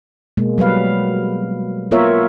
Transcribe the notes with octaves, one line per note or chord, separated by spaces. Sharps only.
B2 G#3 A#3
F#3 G3 B4 F5
A#3 B3 F4 A#4 C#5 E5